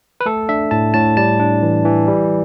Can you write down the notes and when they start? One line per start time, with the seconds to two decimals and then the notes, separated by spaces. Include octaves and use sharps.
0.21 B4
0.26 A3 A4
0.49 D4 E5
0.71 A2 A5
0.94 A2 A5
1.17 G3 A5
1.39 D4
1.62 E3
1.85 E3
2.08 G3